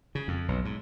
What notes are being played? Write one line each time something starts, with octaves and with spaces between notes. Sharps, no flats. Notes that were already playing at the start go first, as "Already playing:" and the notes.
C#3
F2
B1
G#2